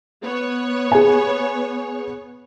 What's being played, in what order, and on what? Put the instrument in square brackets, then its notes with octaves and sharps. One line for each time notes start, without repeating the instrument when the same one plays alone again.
[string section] B3 C#5
[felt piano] G#4 G#5